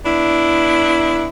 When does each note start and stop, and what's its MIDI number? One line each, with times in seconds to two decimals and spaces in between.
0.05 1.28 59
0.05 1.28 62
0.05 1.28 64